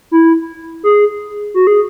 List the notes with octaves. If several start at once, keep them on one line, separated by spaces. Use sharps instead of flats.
E4
G#4
F#4
G#4